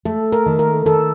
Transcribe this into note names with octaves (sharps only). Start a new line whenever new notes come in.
A3 A4
A#4
D#3
A#4
D#3 A4